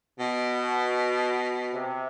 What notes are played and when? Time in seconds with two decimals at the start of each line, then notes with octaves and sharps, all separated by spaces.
0.17 B2
1.72 C3